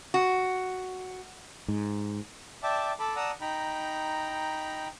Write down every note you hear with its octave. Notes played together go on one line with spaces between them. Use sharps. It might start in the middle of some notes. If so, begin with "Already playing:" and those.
F#4
G#2
D5 E5 G5 A5 D6
A4 A5 B5 D6
D5 F#5 A5 A#5 D#6 E6
D#4 G5 A#5 B5